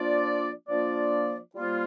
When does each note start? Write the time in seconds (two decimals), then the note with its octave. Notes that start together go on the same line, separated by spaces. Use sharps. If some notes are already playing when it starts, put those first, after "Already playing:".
Already playing: F3 A#3 D4 F4 D5
0.68 F3 A#3 D4 F4 D5
1.55 G3 A#3 F4 C5